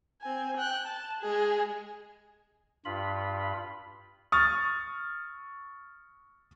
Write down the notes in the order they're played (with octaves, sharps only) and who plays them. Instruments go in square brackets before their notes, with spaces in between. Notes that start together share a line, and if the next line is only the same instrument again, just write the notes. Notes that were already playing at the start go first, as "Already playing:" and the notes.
[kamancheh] C4 G#5
G5 F#6
A5
G#3 G#4
[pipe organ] G2 F4 B5
[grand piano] C#6 D#6 F6 A6